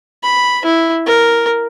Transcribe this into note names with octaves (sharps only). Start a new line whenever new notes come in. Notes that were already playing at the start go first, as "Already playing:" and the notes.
B5
E4
A#4